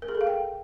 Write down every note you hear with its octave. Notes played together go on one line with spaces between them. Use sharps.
A#4
G#4
A4
F5
G5